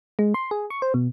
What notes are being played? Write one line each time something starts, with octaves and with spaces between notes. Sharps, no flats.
G#3
C6
G#4
C#6
C5
B2